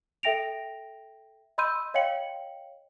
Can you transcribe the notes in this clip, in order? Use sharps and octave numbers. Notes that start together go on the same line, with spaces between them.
A4 E5 G5 A#6 D7 F7
D#5 B5 C6 E6 G6 D#7
C#5 D#5 F5 G5 C#7 F#7